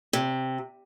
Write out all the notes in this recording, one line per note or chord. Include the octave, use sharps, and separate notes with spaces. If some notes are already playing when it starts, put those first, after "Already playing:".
C3